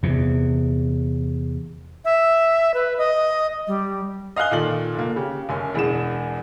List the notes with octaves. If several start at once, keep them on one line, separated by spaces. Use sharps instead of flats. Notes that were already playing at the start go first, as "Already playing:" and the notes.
E2 C3
E5
B4
D#5
G3
D#5 F5 G#5 F#6 G7
A#2 D#3 F4 A4 D5 F#7
F1 A#3
C#3 G4
F#1 F#2 G#5
E1 E2 G#3 G#4 E7